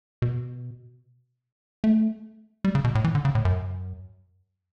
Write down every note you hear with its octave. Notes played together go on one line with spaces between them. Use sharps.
B2
A3
G3
C#3
B2
A2
E3
D3
C#3
A2
F#2